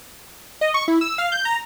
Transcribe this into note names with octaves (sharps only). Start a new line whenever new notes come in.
D#5
C#6
E4
E6
F5
G6
A#5